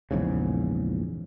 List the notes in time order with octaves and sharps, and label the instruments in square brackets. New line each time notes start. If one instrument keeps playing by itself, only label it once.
[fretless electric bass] A#1 E2 G#2 C#3